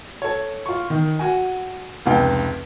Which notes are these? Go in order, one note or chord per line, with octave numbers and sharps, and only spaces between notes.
A4 C#5
F4 C#6
D#3
F#4 G#5
F1 C#2 G5